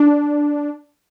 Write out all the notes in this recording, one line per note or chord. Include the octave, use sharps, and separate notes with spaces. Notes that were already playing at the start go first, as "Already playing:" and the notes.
Already playing: D4